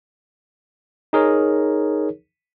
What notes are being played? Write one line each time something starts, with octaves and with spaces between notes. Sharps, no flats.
D#4 G#4 A#4 C#5